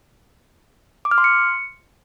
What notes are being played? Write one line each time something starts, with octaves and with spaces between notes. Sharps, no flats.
D6
F6
C6
C#7